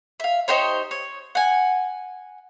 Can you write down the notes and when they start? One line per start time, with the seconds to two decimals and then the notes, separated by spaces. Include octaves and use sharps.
0.20 E5 F5
0.48 D#4 G4 C5 C#5
0.91 C#5
1.35 F#5 G#5